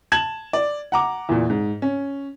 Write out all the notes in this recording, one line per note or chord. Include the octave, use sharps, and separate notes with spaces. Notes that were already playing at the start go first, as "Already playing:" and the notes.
A5 G#6 E7 F#7
D5
F#5 A#5 D6
E2 A#2
G#2
C#4